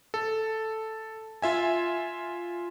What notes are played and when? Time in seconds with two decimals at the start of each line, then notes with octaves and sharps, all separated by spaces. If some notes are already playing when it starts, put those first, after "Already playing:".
0.14 A4
1.42 F4 E5 G#5